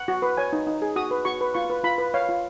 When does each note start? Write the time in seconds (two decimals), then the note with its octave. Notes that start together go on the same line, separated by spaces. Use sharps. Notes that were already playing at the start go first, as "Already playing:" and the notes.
Already playing: F#5
0.08 F#4
0.22 B4
0.37 C#5 G#5
0.53 D#4
0.67 D#4
0.82 G#4
0.96 F#4 D#6
1.11 B4
1.25 F#4 C#6
1.41 B4
1.54 F4 C#6
1.70 B4
1.84 F4 B5
1.98 B4
2.14 C#5 F5
2.29 F4